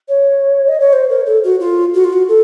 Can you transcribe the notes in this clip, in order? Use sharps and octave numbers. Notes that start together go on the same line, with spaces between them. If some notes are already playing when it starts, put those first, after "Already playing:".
C#5
D#5
C#5
C5
A#4
A4
F#4
F4
F#4
F4
F#4
A4